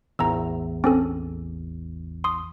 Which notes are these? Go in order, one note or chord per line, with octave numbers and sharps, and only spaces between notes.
A1 E2 A#5 E6
C4 C#4 A4
C6 D#6